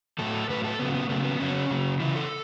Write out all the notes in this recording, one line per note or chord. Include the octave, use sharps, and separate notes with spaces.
A2 F#3 A4
A2 F#3 B4
A4
C#3 F#3 B3
B3
C#3 F#3 A3
B3
C#3 F#3 C#4
C#3 F#3
C#3 E3 E4
A4